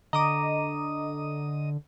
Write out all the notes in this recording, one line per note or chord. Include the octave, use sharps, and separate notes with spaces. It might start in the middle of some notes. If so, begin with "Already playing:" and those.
D3 D#5 A#5 D6 D#6 D#7